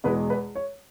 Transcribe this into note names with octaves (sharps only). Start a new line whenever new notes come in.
E2 B2 G#3 B4
B4
C#5